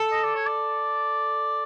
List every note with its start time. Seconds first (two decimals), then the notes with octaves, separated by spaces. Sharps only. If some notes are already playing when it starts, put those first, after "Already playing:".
Already playing: A4
0.12 D#5
0.23 D5
0.35 C#5
0.46 D5